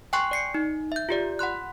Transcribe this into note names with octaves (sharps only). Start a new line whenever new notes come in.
G5 G#5 C6 C#6 F#6 C7
D5 C7 C#7
D#4
E5 G6
F4 G4 D5
F#5 B5 C6 F#6